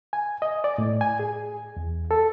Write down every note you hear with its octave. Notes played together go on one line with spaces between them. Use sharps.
G#5
D#5
D5
A2
G#5
G#4
E2
A4